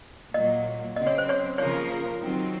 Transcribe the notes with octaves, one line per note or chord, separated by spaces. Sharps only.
A#2 F#3 A#3 D#5
C#3 F#3 C4 D#5
C#5
C5
C#5
C#3 F3 A#3 F4 A#4 C#5
D#3 F#3 C4